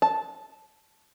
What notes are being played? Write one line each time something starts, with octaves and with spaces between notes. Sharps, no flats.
A5